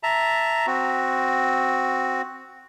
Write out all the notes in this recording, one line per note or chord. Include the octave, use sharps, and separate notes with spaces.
E5 A5 A#5
C4 F#4